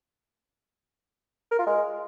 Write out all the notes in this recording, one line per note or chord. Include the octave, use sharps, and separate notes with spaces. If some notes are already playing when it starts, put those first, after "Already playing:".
A#4
F4
G#3